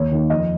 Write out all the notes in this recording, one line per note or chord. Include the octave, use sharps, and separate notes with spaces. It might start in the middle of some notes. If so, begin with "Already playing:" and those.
Already playing: D#2 C#5
D#3 A#3
F2 D#5